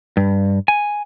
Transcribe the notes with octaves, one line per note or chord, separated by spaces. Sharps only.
G2
G#5